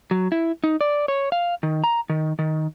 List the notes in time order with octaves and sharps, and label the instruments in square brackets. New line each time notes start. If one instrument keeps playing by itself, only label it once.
[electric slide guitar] F#3
E4
D#4
D5
C#5
F5
D#3
A#5
D#3
D#3